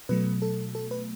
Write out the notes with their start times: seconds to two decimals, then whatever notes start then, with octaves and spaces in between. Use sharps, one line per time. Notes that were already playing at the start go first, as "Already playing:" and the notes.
0.09 B2 F#3 A3 B4
0.42 A4
0.75 A4
0.91 B4